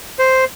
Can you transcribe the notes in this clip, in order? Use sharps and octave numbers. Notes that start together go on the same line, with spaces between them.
C5